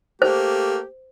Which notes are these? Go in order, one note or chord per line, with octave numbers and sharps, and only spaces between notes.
A3 A#3 G4 C5